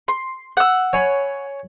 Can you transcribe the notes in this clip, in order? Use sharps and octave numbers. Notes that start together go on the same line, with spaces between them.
C6
F#5 E6
C#5 G#5 B5